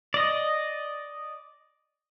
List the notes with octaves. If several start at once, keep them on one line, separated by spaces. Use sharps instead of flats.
D5 D#5